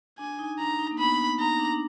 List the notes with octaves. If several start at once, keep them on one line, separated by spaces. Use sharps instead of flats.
D4 G#5
D#4
D4 A#5
D#4
A#3
B3 B5
D#4 A#5
D4
D4